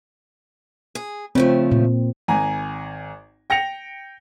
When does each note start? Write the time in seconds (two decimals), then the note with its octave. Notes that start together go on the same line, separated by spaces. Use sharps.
0.95 G#4
1.35 C#3 F3 A3 C4
1.72 A#2
2.28 G#1 G#5 A#5
3.50 G5 A#6 C#7 F7